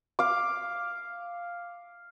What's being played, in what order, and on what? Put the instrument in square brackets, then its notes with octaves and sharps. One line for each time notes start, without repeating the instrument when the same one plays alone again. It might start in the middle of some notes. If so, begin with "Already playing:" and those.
[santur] F5 D6